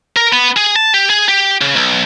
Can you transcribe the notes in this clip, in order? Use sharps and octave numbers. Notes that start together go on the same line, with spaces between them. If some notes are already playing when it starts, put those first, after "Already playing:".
A#4
B3
G#4
A5
G4
G#4
G4
C#3
B1